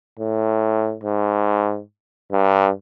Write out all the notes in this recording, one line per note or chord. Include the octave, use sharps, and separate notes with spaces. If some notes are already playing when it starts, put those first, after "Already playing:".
A2
G#2
G2